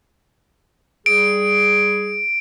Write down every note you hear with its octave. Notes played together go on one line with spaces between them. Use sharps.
G3 G#4 D7